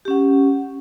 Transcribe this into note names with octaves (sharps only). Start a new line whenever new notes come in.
C#4 G4 F#5